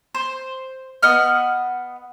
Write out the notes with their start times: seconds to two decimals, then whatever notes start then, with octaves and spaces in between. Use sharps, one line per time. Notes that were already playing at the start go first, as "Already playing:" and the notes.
0.15 C5
1.03 B3 D#5 F#5 F6